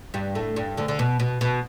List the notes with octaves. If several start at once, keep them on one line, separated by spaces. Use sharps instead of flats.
G2 G3
A2 A3
G2 G3
D2 D3
D3
B2
B2
B2